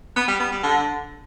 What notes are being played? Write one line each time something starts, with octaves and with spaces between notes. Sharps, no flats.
B3
G3
B3
G3
D3